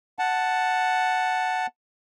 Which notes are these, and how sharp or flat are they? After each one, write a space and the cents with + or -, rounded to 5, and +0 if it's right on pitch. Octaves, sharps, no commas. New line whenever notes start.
F#5 +0 A5 +0